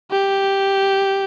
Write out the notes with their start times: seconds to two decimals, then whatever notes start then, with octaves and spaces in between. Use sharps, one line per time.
0.11 G4